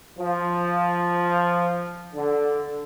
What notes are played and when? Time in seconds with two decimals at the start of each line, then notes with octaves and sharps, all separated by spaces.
0.18 F3
2.14 D3